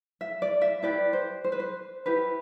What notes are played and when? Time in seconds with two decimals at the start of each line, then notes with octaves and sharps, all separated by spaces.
0.21 E5
0.42 D5
0.62 E5
0.83 E4 G4 B4 D5
1.13 C5
1.44 C5
1.52 B4
1.60 C5
2.06 E4 G4 B4